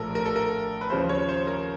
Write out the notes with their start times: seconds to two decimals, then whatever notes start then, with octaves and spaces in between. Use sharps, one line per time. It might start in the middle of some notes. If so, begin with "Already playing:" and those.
Already playing: A#1 A2 F3 A4 A#4
0.15 A#4
0.26 A4
0.36 A#4
0.81 B4
0.90 D#2 C#3 F3 C5
1.09 C#5
1.29 C5
1.47 A#4